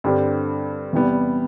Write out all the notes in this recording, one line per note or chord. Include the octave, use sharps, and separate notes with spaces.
G2 D3 G3 C4
E2 C3 G3 B3